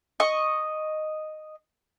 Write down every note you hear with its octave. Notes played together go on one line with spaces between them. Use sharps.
D#5 C#6